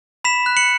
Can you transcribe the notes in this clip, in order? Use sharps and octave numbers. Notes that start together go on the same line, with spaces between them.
B5 B6 E7
F#6
C#7 F#7